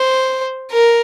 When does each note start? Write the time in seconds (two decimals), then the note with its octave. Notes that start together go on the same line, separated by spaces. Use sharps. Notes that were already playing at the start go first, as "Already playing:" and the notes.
Already playing: C5
0.71 A#4